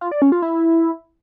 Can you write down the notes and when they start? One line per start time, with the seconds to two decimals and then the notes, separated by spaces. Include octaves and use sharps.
0.01 F4
0.11 D5
0.22 C#4
0.32 F4
0.42 E4